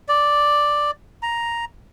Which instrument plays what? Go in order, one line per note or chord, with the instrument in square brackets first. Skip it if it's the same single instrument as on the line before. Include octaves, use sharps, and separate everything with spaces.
[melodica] D5
A#5